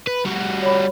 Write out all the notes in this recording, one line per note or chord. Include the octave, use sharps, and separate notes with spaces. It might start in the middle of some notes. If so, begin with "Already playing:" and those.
B4
G3 F#4
C#5 B5